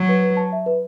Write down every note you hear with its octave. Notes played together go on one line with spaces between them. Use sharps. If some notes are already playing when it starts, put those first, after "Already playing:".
Already playing: F#3
B4
B4
A5
E5
B4